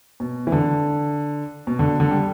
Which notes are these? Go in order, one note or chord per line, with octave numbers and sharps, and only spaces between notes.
B2
E3
D3
B2
D3
D3
G3